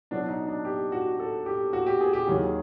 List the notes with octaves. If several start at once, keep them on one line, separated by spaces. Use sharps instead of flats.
B2 F#3 B3 D4
D#4
D4
G4
F#4
A4
G4
F#4
G4
G#4
G4
D#2 D#3 F#3 G#4